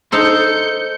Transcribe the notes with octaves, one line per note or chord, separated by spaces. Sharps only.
D#4 A4 C5 G6 C#7